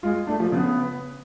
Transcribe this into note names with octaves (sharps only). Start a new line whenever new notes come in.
G#3 F4
A3 D4
F3
C#3 B3